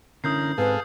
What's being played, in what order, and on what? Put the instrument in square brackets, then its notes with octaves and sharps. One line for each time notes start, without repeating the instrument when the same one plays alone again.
[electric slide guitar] D3 C#4 E4 [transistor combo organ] A#4 [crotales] D#6 G6 C7
[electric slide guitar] G#2 C4 G#5 [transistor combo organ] G#4 A4 F5 [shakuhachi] B4